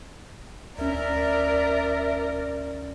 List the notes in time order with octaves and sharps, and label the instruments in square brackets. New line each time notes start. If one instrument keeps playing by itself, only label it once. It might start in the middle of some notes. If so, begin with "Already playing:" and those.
[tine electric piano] D2 C#4 [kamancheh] A#4 [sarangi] D5 [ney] E5